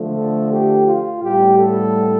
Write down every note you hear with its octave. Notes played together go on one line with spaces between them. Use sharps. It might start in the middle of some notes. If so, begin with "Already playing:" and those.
Already playing: D3 F3 A3
A4
G4
F4
A2 G3 B3 G4
A4